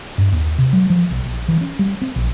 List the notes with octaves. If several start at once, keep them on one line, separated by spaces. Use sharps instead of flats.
G2
D#2
C3
F#3
F3
B1
A#1
E3
C#4
G3
C4
A#1